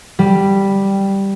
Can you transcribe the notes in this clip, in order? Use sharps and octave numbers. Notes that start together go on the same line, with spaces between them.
G3